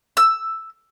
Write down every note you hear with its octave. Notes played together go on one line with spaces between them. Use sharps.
E6